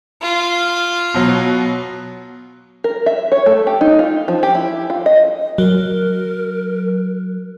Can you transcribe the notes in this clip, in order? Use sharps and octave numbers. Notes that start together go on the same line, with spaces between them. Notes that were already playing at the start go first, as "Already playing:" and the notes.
F4
B2 F#3
A#4
E5
C#5
A3
G4
D#4
F4
F3
G4
E4
F4
D#5
F#3 A#4